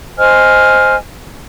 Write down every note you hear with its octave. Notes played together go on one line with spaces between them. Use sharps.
C5 D#5 G#5 F6